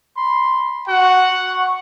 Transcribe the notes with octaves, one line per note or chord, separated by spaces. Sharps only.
B5 C6
F#4 F#5
C#6